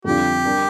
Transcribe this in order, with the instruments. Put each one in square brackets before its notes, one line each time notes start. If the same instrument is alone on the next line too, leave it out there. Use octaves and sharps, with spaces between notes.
[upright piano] F2 D3 G3 D4 F4 [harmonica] G4
[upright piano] G3 D4 A#4